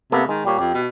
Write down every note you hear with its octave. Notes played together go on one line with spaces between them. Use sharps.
C3 A#3 B3 A4
D#3 G#3
A#2 G3 G4 C#5
F2 G4
B2